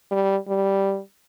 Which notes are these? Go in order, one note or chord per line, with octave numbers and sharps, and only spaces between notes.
G3
G3